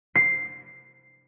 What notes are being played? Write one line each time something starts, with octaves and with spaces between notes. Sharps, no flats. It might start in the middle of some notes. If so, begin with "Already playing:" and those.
C7